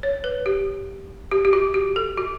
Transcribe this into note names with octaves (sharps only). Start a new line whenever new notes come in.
C#5
B4
G4
G4
G4
F#4
G4
A4
F#4